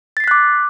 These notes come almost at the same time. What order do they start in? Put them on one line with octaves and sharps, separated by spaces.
A6 C7 B6 F#6 D6